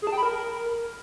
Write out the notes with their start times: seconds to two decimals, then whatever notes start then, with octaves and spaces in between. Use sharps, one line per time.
0.02 G#4
0.07 A5
0.12 G5
0.17 B5
0.23 A#4